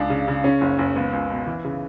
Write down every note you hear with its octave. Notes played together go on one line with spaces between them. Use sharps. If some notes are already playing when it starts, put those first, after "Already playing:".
Already playing: C#2 D4
C#3
C#3
C#3 C#4
F#1
F#1
C#2 B3
C#2
B2
E3
C#3